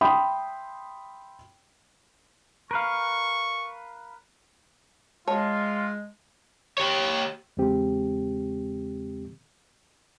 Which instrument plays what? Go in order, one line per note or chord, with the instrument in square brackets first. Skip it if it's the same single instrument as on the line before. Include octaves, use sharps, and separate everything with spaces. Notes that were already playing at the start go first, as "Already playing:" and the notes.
[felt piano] E5 G5 B5 C6 D#6
[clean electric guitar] A#4 B4 F5 [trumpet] C#6
[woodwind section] G#3 [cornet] F4 [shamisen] C#5 [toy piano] A5
[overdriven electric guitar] G4 C#5
[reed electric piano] E2 C#3 G#3 C4 G4